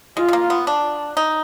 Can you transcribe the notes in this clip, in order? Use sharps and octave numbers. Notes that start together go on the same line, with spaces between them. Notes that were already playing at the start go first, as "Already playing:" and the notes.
G#3 F4
G#3
A#3
B3
D4
D#4